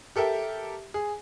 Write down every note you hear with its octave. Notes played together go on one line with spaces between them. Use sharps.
G4 A4 A#4 E5 G5
G#4